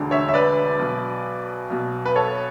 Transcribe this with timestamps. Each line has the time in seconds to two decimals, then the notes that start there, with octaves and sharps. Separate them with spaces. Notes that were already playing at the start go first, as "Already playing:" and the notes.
Already playing: E1 D2 D3
0.11 C#5 E5
0.29 E5
0.34 B4 D5
0.79 B1 B2
1.70 B1 B2
2.05 B4
2.16 A4 C#5